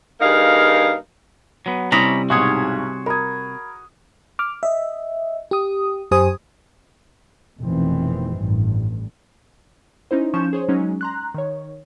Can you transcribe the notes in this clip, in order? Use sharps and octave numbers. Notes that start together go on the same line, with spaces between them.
G2 A#3 D#4 G#4 F5
F#3 B3
C3 G3 C#4 E4 A#5 B5 C#6 D#6
B1 G#2 F#4 G#4 C#5 C6 D#6
A#4 B5 D#6 G#6
D6 F6
D#5 E5
G4 D#6
F#2 G4 C5 G#5 D#6
F1 B2 D#3 E3 C4
A1 G2
C#4 D#4 E4 C5
F3 C#4 C#6 G6 E7
G#4 C5 C#5
F#3 G#3 C#4 D#4
A#5 C6 F#6
D#3 C#5